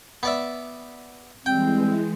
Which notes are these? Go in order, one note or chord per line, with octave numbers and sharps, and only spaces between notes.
B3 D5 E5
E3 G3 G#3 C4 G5